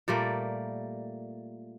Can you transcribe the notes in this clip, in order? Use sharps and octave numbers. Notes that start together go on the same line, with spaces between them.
A#2 G3 A3 A#3